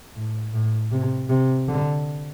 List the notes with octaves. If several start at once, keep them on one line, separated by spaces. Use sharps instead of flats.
A2
A2
C3
C3
D3